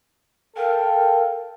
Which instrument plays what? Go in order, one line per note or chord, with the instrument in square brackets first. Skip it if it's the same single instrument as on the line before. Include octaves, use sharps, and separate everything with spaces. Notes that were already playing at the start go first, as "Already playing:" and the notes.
[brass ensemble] A4 F5 G5 [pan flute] A#4